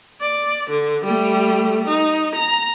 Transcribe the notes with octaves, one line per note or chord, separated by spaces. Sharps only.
D5
D3
G3 A3
D#4
A#5